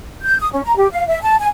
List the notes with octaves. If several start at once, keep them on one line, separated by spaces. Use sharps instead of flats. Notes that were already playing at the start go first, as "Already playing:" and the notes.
G6
D#6
C#4
A#5
G4
F5
E5
A5
G#5